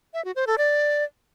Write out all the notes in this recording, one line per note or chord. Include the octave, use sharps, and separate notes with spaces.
E5
F#4
C5
A4
D5